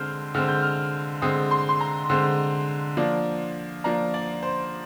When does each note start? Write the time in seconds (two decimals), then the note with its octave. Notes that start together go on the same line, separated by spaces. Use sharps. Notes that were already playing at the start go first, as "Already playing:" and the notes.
Already playing: D3 G#3 C4 F6 G6
0.35 D3 G#3 C4 F6
0.48 G6
0.62 F6
1.22 D3 G#3 C4 D#6
1.51 C6
1.69 C6
1.81 A#5
2.10 D3 G#3 C4
2.97 F3 A#3 D4
3.84 F3 A#3 D4 A#5
4.14 D5
4.43 C5